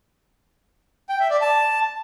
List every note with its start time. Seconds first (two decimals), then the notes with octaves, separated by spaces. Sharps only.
1.09 G5
1.20 E5
1.30 D5
1.41 A5